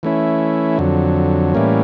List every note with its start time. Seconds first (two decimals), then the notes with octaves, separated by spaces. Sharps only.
0.03 E3 A3 C#4 E4
0.79 F2 D3 F#3
1.54 A2 E3 G3 A#3 C#4